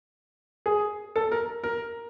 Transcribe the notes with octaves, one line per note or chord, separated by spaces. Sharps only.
G#4
A4
A#4
A#4